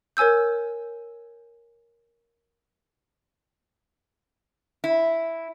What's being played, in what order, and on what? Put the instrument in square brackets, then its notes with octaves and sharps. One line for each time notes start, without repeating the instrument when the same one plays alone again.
[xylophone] A#4 C#5 G#5 E6 G6
[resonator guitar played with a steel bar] E4